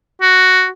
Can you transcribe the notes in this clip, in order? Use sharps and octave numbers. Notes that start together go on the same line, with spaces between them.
F#4